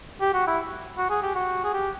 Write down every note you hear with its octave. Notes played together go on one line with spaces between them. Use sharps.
G4
F#4
E4
F#4
G#4
G4
F#4
G#4
G4